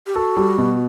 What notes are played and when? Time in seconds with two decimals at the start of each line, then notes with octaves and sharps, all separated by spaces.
0.07 G4
0.15 F#4 A4
0.37 G3
0.58 B2